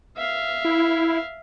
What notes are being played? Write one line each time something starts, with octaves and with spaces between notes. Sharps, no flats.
E5 F5
E4